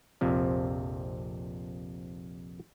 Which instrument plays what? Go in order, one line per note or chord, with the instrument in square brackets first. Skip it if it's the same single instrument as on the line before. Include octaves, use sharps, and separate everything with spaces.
[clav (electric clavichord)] A#1 F2 C3 F3